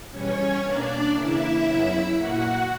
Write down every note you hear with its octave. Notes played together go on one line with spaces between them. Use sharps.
E2 B2 G3 C#4 C#5
B2 A#3 D4 D5
C#3 E3 A#3 E4 E5
F#2 C#3 F#3 B3
A#2 A#3 F#4 F#5